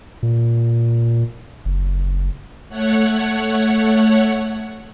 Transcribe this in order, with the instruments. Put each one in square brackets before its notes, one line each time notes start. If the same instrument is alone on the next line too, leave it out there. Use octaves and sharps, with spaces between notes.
[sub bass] A#2
F#1
[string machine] A3 C#5 F#5